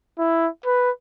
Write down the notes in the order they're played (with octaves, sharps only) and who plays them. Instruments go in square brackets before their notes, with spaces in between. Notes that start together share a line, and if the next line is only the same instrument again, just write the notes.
[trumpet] E4
B4